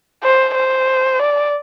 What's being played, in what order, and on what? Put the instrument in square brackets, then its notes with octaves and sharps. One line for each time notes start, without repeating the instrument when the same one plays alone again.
[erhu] C5
C5
D5